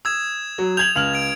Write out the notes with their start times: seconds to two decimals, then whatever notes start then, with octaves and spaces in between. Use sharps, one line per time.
0.05 D#6 E6 G#6 E7
0.58 F#3
0.77 G6 G#6 F7 F#7
0.95 C#2 F6 F#7
1.14 G#6 D7